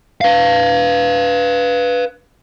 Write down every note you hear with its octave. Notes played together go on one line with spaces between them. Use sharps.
B4 F5